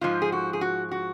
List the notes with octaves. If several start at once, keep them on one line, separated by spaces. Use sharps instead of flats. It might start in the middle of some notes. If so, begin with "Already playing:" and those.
G#2 F3 F4
G#4
F#4
G#4
F#4
F#4